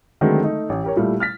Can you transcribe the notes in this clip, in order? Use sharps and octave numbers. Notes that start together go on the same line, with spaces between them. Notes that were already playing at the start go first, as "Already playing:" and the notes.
D3 D#3 F#3 G#3 A3 C4
A3 D#4
A1
G4 A#4 C#5
A#2 G3 A3 E4
F6 A6 B6